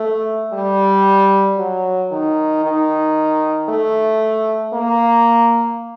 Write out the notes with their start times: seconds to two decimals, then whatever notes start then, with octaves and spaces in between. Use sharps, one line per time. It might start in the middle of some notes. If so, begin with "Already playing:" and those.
Already playing: A3
0.53 G3
1.58 F#3
2.12 D#3
2.64 D#3
3.69 A3
4.73 A#3